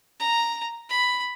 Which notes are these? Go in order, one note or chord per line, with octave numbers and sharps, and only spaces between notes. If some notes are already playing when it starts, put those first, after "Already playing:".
A#5
B5